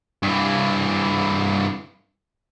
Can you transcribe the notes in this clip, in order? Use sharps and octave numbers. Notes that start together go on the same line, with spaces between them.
G2 E3